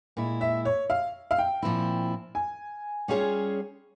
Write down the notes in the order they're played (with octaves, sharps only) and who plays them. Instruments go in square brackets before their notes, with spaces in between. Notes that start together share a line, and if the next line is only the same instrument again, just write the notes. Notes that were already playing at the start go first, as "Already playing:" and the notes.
[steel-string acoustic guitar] A#2 G#3 E4
[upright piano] E5
C#5
F5
F5
G5
[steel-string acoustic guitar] A#2 F3 C4 E4
[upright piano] G#5
[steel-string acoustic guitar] G3 C#4 F4 G#4 C#5